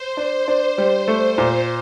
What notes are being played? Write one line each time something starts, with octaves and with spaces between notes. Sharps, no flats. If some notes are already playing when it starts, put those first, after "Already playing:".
Already playing: C5
D4
D4
G3
A3
A#2